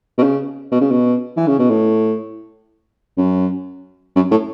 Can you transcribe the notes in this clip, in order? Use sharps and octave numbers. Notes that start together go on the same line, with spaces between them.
B2
C#3
B2
C#3
B2
E3
C#3
B2
A2
F#2
F#2
A2